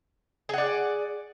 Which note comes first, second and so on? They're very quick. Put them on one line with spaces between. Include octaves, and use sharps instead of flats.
G#4 F#5 D5